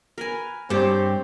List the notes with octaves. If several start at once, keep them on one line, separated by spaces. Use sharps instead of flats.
A#4 B4 G#5
G2 C4 G4 G#4 C5 C#5 G5 A5